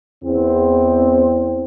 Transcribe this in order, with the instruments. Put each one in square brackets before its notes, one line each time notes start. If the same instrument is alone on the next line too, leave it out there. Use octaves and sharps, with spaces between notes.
[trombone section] E2 C4